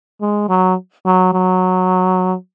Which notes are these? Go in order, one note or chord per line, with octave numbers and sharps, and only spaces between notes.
G#3
F#3
F#3
F#3